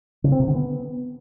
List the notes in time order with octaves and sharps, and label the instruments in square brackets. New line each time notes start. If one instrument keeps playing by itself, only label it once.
[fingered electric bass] C#3
C4
C3
D3
B3